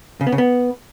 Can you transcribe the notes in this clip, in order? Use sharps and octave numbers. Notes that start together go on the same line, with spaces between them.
C#3
B3
C#3
B3